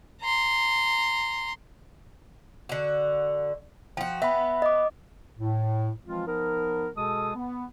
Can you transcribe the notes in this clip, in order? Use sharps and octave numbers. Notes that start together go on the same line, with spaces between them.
A#5 C6
D3 F#4
F3 F#4 G5
B3 E5 F#5 B5
D#5 D6
A2
E3 F3 G#3 C4 F4
F3 B3 D#4 A#4
B2 G#3 G#4 A4 A5 D#6
B3